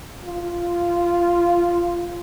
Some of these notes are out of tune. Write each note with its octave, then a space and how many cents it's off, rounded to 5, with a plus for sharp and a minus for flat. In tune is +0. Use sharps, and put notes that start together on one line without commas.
F4 -10